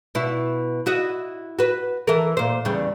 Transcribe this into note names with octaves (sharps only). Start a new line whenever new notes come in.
B2 E4
E4 F#4 D#5
F#4 B4
E3 A4 A#4
A#2 C5
E2 C#3 G3